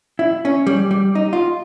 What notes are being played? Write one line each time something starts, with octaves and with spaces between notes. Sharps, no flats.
E4
C#4
G3
G3
D#4
F4